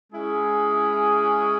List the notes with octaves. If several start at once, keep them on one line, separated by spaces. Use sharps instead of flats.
G#3 C#4 E4 G#4